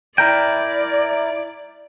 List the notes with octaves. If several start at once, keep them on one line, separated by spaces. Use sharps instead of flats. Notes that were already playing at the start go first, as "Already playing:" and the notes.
E4 A#4 D5 G5